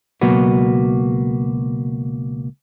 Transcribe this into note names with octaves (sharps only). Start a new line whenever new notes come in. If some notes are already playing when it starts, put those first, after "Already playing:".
C#2 B2 F#3 A#3 F#4 B4